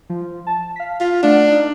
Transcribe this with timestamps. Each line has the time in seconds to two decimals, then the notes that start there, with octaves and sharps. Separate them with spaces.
0.10 F3 F4
0.47 A5
0.76 F5 B6
1.01 F4
1.23 A3 D4 F#5
1.51 D#4